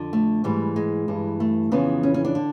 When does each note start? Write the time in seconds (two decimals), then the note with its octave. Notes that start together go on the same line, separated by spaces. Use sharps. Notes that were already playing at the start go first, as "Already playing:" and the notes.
Already playing: F2 D3
0.13 A3
0.44 G#2 E3 G3
0.76 G#3
1.08 G2 E3
1.40 A3
1.72 F2 C#3 E3 B3
2.03 C#4
2.14 C#4
2.25 D4
2.35 D3